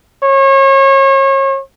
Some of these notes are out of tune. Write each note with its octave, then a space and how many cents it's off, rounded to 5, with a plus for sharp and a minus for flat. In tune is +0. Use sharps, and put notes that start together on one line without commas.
C#5 -35